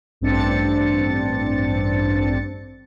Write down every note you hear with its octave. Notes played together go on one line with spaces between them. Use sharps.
A1 G2 C4 D4 A6 C#7